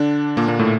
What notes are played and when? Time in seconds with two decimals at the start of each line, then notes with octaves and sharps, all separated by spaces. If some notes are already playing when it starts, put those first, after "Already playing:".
Already playing: D3 D4
0.37 A#2 A#3
0.48 A#2 A#3
0.59 A2 A3